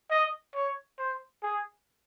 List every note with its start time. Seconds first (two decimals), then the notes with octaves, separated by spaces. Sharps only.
0.11 D#5
0.55 C#5
0.98 C5
1.43 G#4